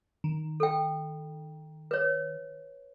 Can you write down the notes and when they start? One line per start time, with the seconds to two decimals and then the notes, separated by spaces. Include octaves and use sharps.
0.24 D#3
0.60 A4 G5
1.91 B4 C#5